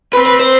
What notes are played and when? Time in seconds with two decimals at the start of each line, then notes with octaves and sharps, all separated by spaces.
0.13 C4 B4
0.26 B4
0.40 C5